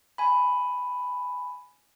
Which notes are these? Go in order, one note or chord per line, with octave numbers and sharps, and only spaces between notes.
G#5 B5